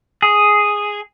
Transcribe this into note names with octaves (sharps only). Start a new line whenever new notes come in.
G#4